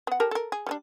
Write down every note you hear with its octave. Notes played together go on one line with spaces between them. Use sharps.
B3 F#5
G4 A4 A#4
A4 A#4
G#4
G3 B3 D4